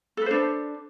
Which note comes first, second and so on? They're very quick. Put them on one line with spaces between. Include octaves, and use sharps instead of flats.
A4 B4 C5 D4